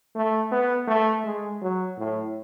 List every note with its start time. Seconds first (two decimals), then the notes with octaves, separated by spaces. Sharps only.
0.15 A3
0.52 B3
0.87 A3
1.24 G#3
1.61 F#3
1.98 A2